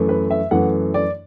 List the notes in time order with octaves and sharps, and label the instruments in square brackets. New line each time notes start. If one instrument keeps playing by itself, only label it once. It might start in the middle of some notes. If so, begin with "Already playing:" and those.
Already playing: [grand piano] F#2 E3 A3
B4
E5
F#2 E3 A3 F#5
D5